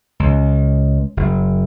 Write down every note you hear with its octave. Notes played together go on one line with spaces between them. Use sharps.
C#2
F#1